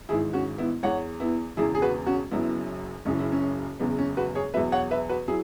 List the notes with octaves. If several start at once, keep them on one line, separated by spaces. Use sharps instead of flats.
G#1 G#2 E3 E4 G#4
C#4 F#4
B3 E4
E2 E3 C#5 F#5
B3 E4
E1 E2 C#3 E4 G#4
G#4
F#4 B4
C#4 F#4
F#1 F#2 F#3 B3 E4
F#1 F#2 C#3 E3 C#4
E4
C#4
F#1 E2 C#3 B3
C#4
F#4 B4
G#4 C#5
E2 B2 F#3 B4 E5
C#5 F#5
B4 E5
F#4 B4
F#3 E4 G#4